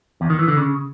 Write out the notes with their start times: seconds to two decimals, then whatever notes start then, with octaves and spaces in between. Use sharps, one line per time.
0.21 E2
0.30 D#3
0.39 E3
0.48 D3
0.57 C#3